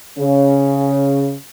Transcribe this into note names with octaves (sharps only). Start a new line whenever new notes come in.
C#3